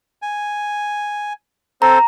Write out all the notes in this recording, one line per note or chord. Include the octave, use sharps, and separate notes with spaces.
G#5
C4 A4 C5 A#5